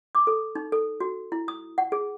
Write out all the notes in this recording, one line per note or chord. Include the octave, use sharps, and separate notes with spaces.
D6
A4
D#4
A4
F#4
E4
D#6
F#5
G#4